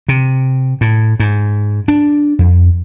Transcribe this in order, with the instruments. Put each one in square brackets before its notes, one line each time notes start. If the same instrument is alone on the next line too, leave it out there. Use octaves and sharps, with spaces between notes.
[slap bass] C3
A2
G#2
D4
F2